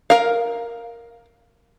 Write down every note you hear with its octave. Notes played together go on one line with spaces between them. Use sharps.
A#4 F5